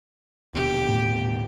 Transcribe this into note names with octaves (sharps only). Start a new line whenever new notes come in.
D#1 B2 D3 G4
A2